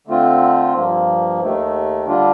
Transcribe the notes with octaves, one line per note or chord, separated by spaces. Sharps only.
D3 A3 C4 F4
G2 F3 A#3
D#2 D#3 A3
D3 G3 D4 F4